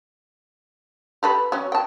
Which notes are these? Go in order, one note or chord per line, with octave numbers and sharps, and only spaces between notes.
G4 A4 B4
F#3 C#4
G5 A5